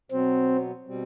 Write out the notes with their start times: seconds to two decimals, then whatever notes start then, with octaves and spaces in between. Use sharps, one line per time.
0.11 B2 F#3 B3 C4
0.87 B2 G3 C4